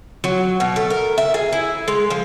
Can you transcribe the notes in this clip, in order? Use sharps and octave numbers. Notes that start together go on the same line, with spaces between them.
F#3
B2
A3
A#4
E5
G#4
E4
G#3
F3